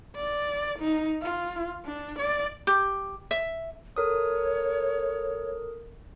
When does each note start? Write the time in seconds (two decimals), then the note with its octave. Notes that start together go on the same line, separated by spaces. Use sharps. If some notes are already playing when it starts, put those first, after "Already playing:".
0.16 D5
0.79 D#4
1.22 F4
1.85 D4
2.19 D5
2.67 G4
3.31 E5
3.96 A4 A#4 C#5 D#6